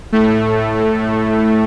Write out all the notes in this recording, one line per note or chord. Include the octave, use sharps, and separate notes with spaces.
A2 A3